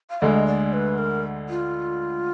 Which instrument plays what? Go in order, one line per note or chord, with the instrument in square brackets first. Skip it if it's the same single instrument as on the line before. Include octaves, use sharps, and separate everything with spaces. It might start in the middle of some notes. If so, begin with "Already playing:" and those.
[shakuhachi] F5
[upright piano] D2 D3 G#3 [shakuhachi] D#5
[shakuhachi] D5
B4
A#4
F4